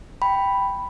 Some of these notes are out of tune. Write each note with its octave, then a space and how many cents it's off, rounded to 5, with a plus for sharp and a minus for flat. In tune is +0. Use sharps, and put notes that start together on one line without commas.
G5 +0 B5 +0